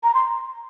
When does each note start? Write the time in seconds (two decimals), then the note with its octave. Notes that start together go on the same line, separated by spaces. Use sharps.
0.03 A#5
0.15 C6